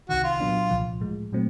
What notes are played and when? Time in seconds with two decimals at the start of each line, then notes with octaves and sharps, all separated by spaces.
0.09 C2 C3 D#3 F#4
0.24 F4
0.40 A#2 F#3 B3 D4
0.70 C2 A#2 F3
1.01 A2 F3 G#3
1.32 A#2 F#3 A3 C4